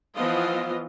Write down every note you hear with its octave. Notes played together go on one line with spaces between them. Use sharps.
E3 F3 B3 F4 D#5